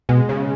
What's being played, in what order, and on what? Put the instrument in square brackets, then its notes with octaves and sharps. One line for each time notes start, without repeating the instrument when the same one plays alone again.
[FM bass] B2 [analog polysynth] G#3
[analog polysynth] C#3